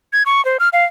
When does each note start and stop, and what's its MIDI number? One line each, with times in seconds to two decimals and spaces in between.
0.13 0.23 92
0.26 0.44 85
0.45 0.57 72
0.60 0.69 89
0.73 0.85 77